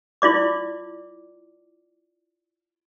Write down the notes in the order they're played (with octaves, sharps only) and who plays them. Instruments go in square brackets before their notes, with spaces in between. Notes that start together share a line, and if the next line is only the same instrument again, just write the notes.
[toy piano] E4 F4 D5 D6